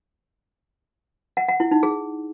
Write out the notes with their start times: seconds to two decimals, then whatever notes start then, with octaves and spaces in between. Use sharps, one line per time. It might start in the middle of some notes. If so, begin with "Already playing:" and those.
1.37 F#5
1.48 F#5
1.60 E4
1.71 D#4
1.83 G#4